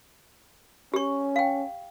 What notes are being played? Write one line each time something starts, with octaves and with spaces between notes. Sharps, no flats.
C#4 G4 C#6
F5 G5